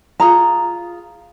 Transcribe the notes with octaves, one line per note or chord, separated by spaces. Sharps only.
F4 G#4 A#5